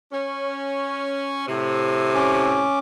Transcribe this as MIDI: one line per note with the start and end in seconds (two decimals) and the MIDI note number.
0.11 1.45 61
1.48 2.66 45
1.48 2.66 48
2.15 2.79 61
2.15 2.79 86